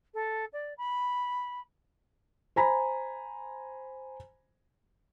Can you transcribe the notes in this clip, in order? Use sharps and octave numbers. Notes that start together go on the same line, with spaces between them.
A4
D5
B5
C5 G#5 A#5 B5